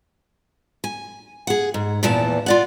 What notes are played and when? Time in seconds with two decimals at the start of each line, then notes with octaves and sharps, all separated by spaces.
0.84 G#5
1.47 G#4 F#5
1.74 G#2
2.03 E2 A#2 E3 F3 A5
2.46 F4 D5 F#5